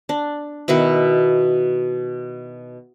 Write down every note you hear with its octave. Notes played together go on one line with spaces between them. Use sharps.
D4
B2 D#3 E4 F#4